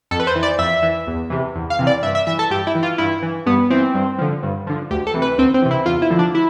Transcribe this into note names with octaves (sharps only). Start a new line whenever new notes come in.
F2 A4
B4
C5
E3
D5
F2 E5
E3
E2
C3 E3
E2
F5
C3 E3
D5
G2 E5
E5
E3 E5
A4
G2 G4
E4
E3
F4
G2 E4
E3
G2 B3
E3 C4
G2
D3 F3
G2
D3 F3
D2 G4
A4
C3 E3
B4
D2 C4
C4
C3 E3
E4
E2 F4
E4
D3 F3
D4
E4